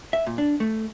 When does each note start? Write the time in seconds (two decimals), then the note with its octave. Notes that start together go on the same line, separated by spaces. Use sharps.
0.13 E5
0.26 A#2
0.38 D4
0.60 A3